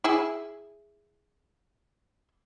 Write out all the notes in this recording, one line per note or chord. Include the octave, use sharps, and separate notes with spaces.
E4 G#4